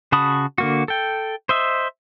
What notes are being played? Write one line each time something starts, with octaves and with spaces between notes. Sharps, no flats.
C#3 F#4 A5 B5 D#6
D3 A#3 F#4
A4 G5
C5 D#5 E5